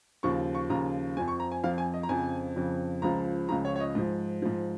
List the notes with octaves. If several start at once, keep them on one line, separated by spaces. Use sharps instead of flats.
D#2 C#3 F3 C#6
C#6
D#2 C#3 F3 A#5
F2 F3 G#5
C#6
A#5
G#5
F2 F3 F5
G#5
D#5
A#5
F2 C#3 F3 G#5
F2 C#3 F3
C#2 C#3 F3 A#5
C#2 C#3 F3 A#5
C#5
C#5
D#5
G#2 F3
G#2 F3